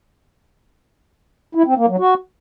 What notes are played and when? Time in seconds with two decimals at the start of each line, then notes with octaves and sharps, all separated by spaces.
1.55 E4
1.66 C4
1.77 A#3
1.88 F#3
1.99 F#4